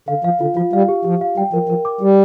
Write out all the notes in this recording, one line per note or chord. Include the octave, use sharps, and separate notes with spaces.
D3 F5
F3 F5
D3 F4
F3 F4
G3 F5
G4
F3 G4
F5
G3 G5
F3 A#4
F3 A#4
D6
G3 G4